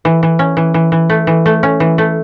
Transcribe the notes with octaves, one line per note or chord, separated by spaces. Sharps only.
E3
E3
C#4
E3
E3
E3
A3
E3
A3
C#4
E3
A3